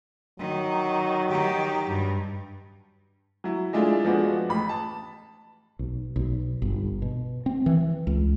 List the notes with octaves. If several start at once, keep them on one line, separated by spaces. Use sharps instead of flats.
D#3 F#3
D#3 G4
G2
F#3 E4
G#3 A3 D4 E4 F4 G#4
F3 G#3 B3 D4 F#4
A1 B5
A5
B1
B1
G1
B2
C4
E3
C#2